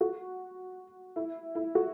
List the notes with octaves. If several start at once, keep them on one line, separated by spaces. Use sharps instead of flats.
F#4
E4
E4
F#4